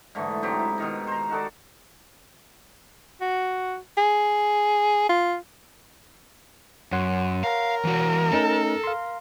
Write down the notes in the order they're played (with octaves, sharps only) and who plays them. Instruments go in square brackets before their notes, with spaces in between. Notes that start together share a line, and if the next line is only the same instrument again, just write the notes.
[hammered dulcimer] G#2 D3 E3 A3
G#2 F#3 C4 G4
E4
B2 D#3 D#4
C5 A#5
D#4 F#4 A4 D5
[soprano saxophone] F#4
G#4
F4
[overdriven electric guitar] F#2 [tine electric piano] C#5 F#5 C6
[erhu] A#4 [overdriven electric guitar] F5
[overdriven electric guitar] E3 F#4
[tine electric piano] A3 C#4 D#4 [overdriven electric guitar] A4
[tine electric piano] F5 C6